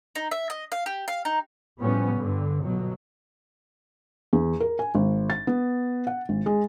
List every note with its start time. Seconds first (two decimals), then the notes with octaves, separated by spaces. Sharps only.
0.15 D#4
0.31 E5
0.50 D#5
0.72 F5
0.86 G4
1.08 F5
1.25 D#4
1.80 A2 F3 G3 B3 C#4
2.16 G2 D3
2.64 G1 B2 F#3
4.33 E2
4.60 A#4
4.79 G#5
4.95 G#1
5.30 A6
5.47 B3
6.07 F#5
6.29 G#1
6.46 G#3